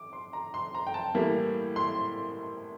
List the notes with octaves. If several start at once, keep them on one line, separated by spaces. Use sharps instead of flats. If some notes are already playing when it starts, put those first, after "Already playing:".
Already playing: D6
C6
A#5
C6
A#5
G5
A5
A2 E3 G3 A#3
C6